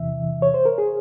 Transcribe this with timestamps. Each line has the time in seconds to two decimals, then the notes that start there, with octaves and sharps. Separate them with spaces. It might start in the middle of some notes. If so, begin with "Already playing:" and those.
Already playing: E2 C3 E3 E5
0.42 C#5
0.54 C5
0.65 A#4
0.78 G#4